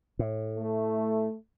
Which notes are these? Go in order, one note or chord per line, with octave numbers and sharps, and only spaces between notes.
A2
A3